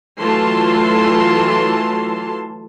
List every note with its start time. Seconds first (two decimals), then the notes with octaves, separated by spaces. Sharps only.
0.20 E3 F#3 A3 F4 A5 C6